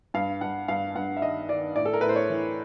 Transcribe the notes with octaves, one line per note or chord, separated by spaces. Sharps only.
G2 F5
G2 F#5
G2 F5
G2 F#5
E5
D#3 D#5
D#3 D5
A2 D5
A4
A#4
A2 B4
C5
C#5
E3